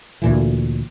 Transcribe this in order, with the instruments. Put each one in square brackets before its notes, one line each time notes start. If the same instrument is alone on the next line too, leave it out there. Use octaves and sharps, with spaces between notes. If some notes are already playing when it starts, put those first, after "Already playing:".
[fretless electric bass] D2 A#2 E3